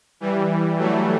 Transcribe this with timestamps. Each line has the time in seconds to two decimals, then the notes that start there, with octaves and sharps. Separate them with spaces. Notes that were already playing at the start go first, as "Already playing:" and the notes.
0.20 E3 G3
0.79 F#3 A3